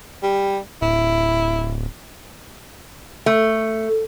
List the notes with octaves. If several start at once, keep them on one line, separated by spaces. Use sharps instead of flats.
G3
D1 E4
A3